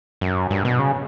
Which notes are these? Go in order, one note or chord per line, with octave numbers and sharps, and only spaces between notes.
F#2
G2
B2
C#3